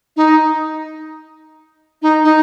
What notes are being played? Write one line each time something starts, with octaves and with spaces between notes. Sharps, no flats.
D#4
D#4
D#4